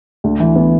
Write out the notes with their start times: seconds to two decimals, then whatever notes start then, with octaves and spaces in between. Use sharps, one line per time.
0.24 D2
0.40 E3
0.56 B3